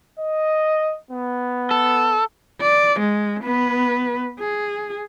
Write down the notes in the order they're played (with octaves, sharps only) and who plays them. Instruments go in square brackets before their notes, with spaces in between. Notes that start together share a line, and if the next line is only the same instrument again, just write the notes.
[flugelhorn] D#5
B3
[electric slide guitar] A4
[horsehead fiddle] D5
G#3
B3 B4
G#4